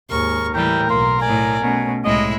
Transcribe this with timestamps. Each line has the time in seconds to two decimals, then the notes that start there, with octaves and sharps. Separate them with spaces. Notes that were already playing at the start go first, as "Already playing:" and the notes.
0.11 D#2 G#2 A#4 C#6
0.54 A2 E3 G3 A#4 G5
0.90 B1 A#3 C6
1.22 A2 D5 G#5
1.61 B2 A3 C#4
2.05 C2 A2 G#3 E4 D#5